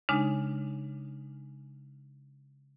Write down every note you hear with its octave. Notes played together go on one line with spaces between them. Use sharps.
C#3 G#3 D4 D#4